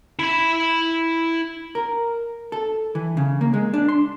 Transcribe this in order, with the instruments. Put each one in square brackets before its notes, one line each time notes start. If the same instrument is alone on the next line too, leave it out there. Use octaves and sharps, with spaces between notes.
[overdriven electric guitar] E4 B5
[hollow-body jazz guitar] A#4
A4
E3
C#3
A#3
G#3
D4
C6